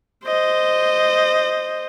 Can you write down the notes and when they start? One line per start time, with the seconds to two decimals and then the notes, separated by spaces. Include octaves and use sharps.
0.25 C5 D#5